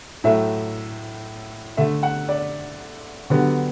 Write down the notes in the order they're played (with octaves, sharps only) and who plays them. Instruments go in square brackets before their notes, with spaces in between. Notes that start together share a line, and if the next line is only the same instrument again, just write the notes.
[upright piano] A2 F#3 A3 E5
D3 A3 E5
F#5
D5
D3 F#3 B3 G4